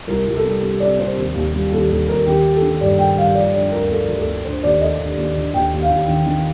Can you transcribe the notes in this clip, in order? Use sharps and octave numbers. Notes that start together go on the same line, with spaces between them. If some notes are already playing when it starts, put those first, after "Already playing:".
C2 A#4
C2
A4
G3
G3
C3 D5
C3 C5
D#2
D#2
G3
D#2 A4
D#2 A4
D#2 A#4
D#3 G4
A3
A4
D#3
G2 D5
A3 G5
G2 F5
F3 D5
D3 D5
D2 A#4
A3 A4
D2
A4
A3
D3 C5
D#2 D5
A3 D#5
D3
D#2
D3
D#2 G5
D#2
F5
D#2
D#3
D#3